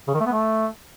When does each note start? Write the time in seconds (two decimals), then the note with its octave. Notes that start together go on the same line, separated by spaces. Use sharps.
0.08 C#3
0.14 D#3
0.20 A3
0.26 B3
0.32 A3